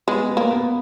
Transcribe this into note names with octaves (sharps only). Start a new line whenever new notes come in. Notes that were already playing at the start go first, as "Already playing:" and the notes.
G#3 B3
B3
A#3
B3